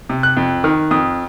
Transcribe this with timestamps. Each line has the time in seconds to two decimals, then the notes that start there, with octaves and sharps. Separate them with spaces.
0.10 C3
0.23 F#6
0.37 F2
0.64 D#3 F6
0.91 F2 D#6